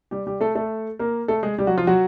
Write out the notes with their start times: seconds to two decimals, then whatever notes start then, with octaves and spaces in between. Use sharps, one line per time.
0.11 G3 G4
0.27 G3 G4
0.41 A3 A4
0.55 A3 A4
0.99 A#3 A#4
1.28 A3 A4
1.43 G#3 G#4
1.58 G3 G4
1.67 F#3 F#4
1.78 F3 F4
1.87 F#3 F#4